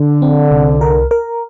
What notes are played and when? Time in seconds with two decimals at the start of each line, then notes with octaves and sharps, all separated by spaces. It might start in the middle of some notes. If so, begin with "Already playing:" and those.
Already playing: D3
0.22 C4
0.51 C2
0.81 A#4
1.11 A#4